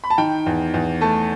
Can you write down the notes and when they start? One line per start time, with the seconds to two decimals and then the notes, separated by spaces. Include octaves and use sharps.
0.04 B5
0.10 A5
0.18 D#3 G5
0.46 E2
0.74 E2
1.01 A3 A5